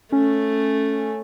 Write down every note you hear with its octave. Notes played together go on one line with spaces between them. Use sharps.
A3 C#4